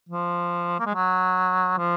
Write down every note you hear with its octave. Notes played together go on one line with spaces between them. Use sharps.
F3
A#3
G#3
F#3
F3